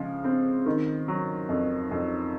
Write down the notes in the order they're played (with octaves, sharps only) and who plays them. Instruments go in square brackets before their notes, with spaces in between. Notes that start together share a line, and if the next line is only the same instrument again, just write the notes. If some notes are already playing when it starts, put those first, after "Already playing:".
Already playing: [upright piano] C#3 F3 G#3
C4
D#3
F#3
F2
F2